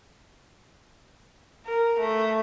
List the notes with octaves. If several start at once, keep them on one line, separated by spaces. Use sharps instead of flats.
A#4
A3